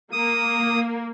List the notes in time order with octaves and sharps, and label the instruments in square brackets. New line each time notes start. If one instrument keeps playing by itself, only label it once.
[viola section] A#3 [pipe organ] D#6